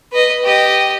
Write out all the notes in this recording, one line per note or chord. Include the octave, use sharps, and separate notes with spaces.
B4 D#5
G4 D#5